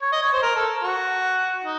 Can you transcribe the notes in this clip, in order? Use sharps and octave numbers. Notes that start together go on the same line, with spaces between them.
C#5
D#5
C#5
C5
A#4
A4
F#4
D#4